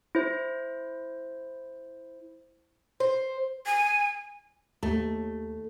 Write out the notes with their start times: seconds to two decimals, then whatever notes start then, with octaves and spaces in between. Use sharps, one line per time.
0.15 E4 C5
3.00 C5
3.66 G#5
4.83 D#2 A3